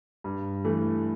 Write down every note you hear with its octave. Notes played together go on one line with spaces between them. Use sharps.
G2
E3 A3